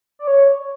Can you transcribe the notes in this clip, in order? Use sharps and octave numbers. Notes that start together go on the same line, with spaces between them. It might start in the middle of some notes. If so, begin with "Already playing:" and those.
D5
C#5